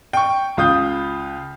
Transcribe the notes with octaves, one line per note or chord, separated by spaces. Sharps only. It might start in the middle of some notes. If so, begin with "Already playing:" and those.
G5 C#6
C#2 F4 D#6 G6